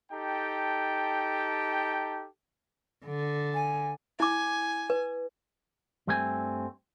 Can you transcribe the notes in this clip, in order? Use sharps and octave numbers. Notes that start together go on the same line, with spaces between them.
D#4 G4 A4 G5 A5
D3
G#5
E4 G#5 D6
B4
G2 G3 A3 C4 A4 G#5